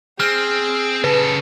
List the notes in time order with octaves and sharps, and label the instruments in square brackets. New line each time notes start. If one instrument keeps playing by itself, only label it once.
[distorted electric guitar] C4 [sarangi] G#4 [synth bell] F6
[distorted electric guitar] C#3 A4 [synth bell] B4